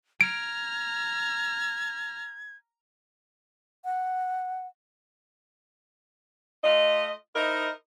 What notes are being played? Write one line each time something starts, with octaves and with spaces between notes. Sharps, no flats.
A#5 F6 G#6 D7
F#5
A3 F4 D#5
D#4 E4 A#4 C5 D#5